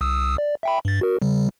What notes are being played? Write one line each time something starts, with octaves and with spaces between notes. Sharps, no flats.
C2 D#6 E6
D5
E5 G5 B5
G2 A6
F#4 A#4
C#3 G3